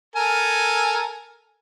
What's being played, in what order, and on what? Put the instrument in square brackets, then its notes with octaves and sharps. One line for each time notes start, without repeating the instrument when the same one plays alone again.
[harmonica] A4 A#4 G#5